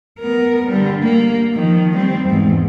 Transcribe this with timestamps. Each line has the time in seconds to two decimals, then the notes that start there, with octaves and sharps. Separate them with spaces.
0.20 B3 A#4
0.67 D3 G3
1.02 A#3
1.55 D#3 F3
1.95 G3 C4
2.26 E2 G#2